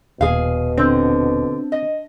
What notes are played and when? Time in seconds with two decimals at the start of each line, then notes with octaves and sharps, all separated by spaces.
0.21 D#1 B2 G#4 F5
0.78 D3 C4
1.72 D#5